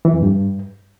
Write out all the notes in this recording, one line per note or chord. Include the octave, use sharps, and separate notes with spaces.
E3
F2
G2